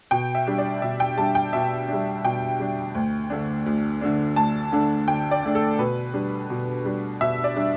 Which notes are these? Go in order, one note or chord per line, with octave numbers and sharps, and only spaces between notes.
B2 G5
E5
G3 D4
D5
B2 E5
G5
G3 D4 A5
G5
B2 E5
G3 D4
B2 G5
G3 D4
D2
D3 A3 D4
D2
D3 A3 D4
D2 A5
D3 A3 D4
D2 G5
D5
D3 A3 D4
A4
B2 B4
G3 D4
B2
G3 D4
B2 E5
D5
G3 D4